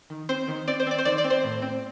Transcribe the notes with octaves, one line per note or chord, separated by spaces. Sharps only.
D#3
C4 C5
D#3
C4 D5
C5
C4 D5
C5
D#3 D5
D5
C4
C5
A2
C4